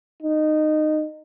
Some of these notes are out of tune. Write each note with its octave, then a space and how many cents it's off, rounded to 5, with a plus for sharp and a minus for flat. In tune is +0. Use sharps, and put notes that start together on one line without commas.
D#4 -15